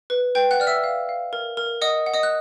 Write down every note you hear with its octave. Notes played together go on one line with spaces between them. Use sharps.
B4
B4 G5 G6
F#5 F#6
D5 F6
E5 E6
F5
F5
A#4
A#4
D#5 F#5 D#6
F#5
D#5 D#6
F#6